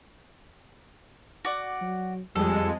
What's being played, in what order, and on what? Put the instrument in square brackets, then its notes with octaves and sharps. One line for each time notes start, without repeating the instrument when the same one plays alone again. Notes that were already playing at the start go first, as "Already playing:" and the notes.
[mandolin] F#4 D5
[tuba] F#3
[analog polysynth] F2 G#3 [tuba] G3 [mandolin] A4